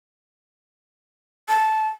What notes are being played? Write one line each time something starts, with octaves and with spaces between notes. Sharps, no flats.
A5